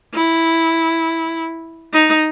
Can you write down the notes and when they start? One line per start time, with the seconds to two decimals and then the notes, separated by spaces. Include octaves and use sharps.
0.14 E4
1.93 D#4